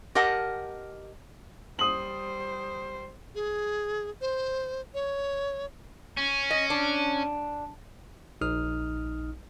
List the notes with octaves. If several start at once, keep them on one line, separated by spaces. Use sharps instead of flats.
G4 A#4 D#5 F#5 A5
G3 C5 D#6 F#7
G#4
C5
C#5
C#4
D#5
D4
A#1 D#4 D#6 F6